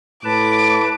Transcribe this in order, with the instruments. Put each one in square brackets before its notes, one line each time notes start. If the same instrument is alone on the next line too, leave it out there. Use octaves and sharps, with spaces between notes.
[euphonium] A2 [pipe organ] B4 A5 [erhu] D6